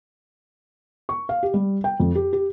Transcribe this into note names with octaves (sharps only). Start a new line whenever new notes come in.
C#6
F5
G4
G3
G5
F2
G4
G4